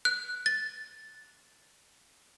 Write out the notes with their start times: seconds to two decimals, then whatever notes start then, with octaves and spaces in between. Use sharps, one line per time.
0.05 F#6
0.46 A6